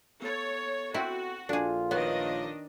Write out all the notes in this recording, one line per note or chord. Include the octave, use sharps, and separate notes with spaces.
B3 A4 C#5 A6
C4 E4 F#4
A#1 D4 F4 G#4 A4
D#3 B3 D4 F#4 C#5 D#5